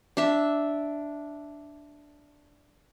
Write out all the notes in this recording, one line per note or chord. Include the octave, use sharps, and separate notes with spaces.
D4 E5